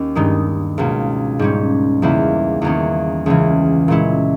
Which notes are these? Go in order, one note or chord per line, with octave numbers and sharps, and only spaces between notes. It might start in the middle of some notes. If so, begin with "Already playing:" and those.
Already playing: D#2 C#4
G2 D#3 G#3 D#4
C#2 B2 A#3
G#2 G3 C#4
E2 C#3 G3 A#3 E4
E2 D#3 A#3 C#4
C#2 C#3 E3
A#2 G#3 C#4 E4